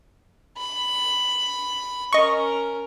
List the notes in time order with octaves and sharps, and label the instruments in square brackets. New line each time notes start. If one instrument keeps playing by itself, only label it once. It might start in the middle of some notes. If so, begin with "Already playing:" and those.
[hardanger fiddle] B5
[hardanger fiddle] C#4 A#4 [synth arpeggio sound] D#5 C#6